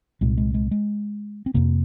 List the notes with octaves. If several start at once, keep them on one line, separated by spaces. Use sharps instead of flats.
C2 A#2 G#3
G#3
G#3
G#3
C4
F2 C3 A#3